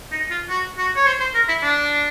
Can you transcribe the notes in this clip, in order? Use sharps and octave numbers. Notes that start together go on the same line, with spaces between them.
D#4
F4
F#4
F#4
C#5
C5
C5
A#4
E4
D4